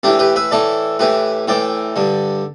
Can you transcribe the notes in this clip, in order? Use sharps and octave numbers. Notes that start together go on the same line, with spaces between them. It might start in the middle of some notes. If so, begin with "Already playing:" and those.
A2 E3 D4 G4
G4 B4
B4 E5
A2 E3 A4 D5
A2 E3 G4 B4
A2 E3 D5 G5
G2 D3